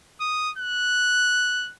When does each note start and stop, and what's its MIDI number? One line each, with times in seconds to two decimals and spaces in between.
0.21 0.51 87
0.58 1.72 90